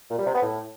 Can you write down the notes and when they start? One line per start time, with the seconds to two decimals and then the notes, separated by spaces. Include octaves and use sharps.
0.10 A#2
0.18 G3
0.26 C3
0.34 B3
0.42 A2